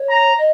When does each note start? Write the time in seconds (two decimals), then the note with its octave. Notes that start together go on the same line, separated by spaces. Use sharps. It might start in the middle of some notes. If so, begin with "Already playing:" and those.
Already playing: C#5
0.09 A#5
0.38 D#5